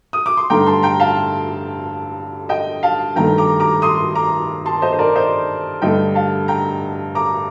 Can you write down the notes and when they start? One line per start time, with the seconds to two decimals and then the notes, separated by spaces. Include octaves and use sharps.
0.13 D#6
0.26 D6
0.37 C6
0.50 G2 D3 A3 G5 A#5
0.66 A5 C6
0.83 G5 A#5
1.00 F5 A5
2.49 D#5 G5
2.83 F5 A5
3.16 G2 D#3 A3 G5 A#5
3.38 A#5 D6
3.60 A#5 D6
3.82 C6 D#6
4.15 A#5 D6
4.66 A5 C6
4.82 C5 D#5
4.93 C5
4.99 A#4 D5
5.15 C5 D#5
5.82 G2 D3 A3 D#5 G5
6.15 F5 A5
6.48 G5 A#5
7.15 A#5 D6